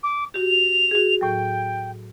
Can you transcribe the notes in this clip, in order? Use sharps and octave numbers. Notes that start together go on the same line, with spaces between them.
D6
F#4 G4 F7
F#4 G#4
A2 F#3 G5